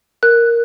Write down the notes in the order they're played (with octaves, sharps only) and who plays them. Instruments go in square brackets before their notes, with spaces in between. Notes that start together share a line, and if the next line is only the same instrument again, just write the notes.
[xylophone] A#4 F#6